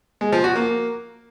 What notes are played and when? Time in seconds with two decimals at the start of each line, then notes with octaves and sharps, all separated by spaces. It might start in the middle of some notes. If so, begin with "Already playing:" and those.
0.21 G#3
0.32 F3
0.44 F#4
0.56 A#3